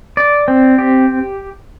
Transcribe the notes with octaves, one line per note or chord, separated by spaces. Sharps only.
D5
C4
G4